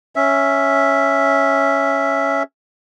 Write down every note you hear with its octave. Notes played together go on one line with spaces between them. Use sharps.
C#4 E5